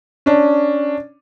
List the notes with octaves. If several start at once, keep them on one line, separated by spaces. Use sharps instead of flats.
C#4 D4